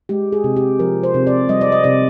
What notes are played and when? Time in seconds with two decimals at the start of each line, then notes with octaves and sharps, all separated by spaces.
0.09 G#3 G4
0.32 G#4
0.44 C3
0.57 G4
0.79 F3 A#4
1.03 C5
1.14 C3
1.27 D5
1.49 G3 D#5
1.61 D5
1.72 D#5
1.84 C3 D5